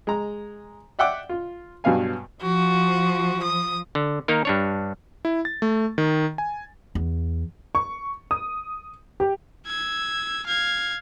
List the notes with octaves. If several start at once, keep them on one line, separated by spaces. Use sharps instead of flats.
G#3 A#5
D5 E5 F#5 G5 D6
F4
G2 B2 F#3 F5 G#5
F3 F#4
D#6
D3
D#3 A#3 D#4 A#4
G2 D4 C#5
E4
A6
A3
D#3
G#5
E2
C#6
D#6
G4
E6 G#6
F5 G#6